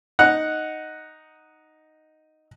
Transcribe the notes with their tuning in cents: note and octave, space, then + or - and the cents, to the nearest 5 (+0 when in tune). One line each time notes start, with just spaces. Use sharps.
D#4 +0 F#5 +0